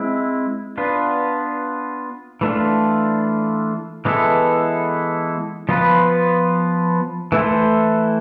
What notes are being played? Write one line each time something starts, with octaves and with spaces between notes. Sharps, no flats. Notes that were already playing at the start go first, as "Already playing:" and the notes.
Already playing: G#3 C4 E4
B3 D4 F4 B4
E3 A3 D4 F4
E3 G#3 B3 E4 A4
F3 B3 F4 B4
E3 A3 E4 A4 C5